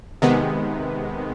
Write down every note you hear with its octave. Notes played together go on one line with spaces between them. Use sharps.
C3 D#3 G#3 B3